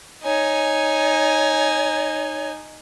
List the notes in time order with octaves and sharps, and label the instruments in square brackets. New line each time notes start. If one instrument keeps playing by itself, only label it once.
[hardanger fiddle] D#4 G#5 [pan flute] C#5